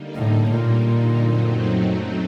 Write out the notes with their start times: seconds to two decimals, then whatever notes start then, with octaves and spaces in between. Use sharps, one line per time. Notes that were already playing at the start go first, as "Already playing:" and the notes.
Already playing: D3 G3 A#3 D#4
0.15 A2
0.50 A#2
1.20 F#2 F#3 A3 C4 D#4